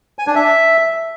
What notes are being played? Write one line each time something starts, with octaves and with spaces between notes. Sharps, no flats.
G#5
D4
E5